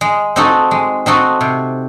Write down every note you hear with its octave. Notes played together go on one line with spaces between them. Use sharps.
G#3
C4 D#4 F#4 A4
G#3
C4 D#4 F#4 A4
C3